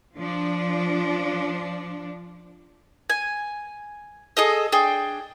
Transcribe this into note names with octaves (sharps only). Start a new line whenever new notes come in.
F3 D4
G#5
G#4 A4 D#5
D4 G#4 G5